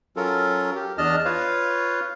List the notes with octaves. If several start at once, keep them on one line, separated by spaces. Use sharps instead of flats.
F#3 C#4 F4 A4 A#4
G4
E2 D4 D#5 A5 F6
F4 B4 C#5 F5